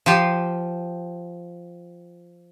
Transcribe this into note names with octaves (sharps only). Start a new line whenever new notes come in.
F3 F4 G4